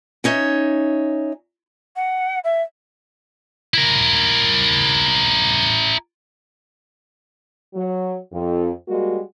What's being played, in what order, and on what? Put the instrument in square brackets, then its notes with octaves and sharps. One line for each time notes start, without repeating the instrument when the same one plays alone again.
[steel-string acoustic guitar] C#4 D#4 C#5 E5
[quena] F#5
E5
[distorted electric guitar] E4 A#4
[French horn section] F#3
F2
G3 G#3 A#3 F#4